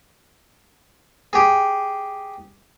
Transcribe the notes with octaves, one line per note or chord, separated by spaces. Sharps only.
G4 G#4